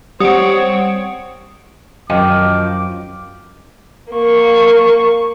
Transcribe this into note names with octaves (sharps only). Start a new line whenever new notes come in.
G3 C4 C#5 F#5 D#6 D7
F#2 D#3 F3 D6
A#3 C#6